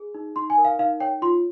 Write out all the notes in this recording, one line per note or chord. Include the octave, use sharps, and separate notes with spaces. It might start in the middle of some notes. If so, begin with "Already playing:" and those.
Already playing: G#4
D#4
D#4 C6
G#5
A#4
F5
D#4 F5
C#5 G5
F4 C6